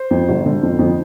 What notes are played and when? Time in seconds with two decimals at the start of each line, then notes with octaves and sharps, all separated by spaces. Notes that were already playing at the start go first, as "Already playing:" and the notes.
Already playing: C5
0.11 F2
0.29 G1
0.46 D3
0.63 F2
0.79 F2